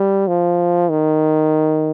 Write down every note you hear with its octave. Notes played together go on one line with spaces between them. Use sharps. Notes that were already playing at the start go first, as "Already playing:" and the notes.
Already playing: G3
F3
D#3